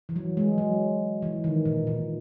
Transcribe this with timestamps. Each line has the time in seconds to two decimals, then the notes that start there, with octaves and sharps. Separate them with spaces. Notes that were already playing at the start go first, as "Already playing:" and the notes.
0.09 E3
0.16 F#3
0.37 G#3
0.58 F#3
1.22 E3
1.44 D#3
1.66 A#2
1.87 A#2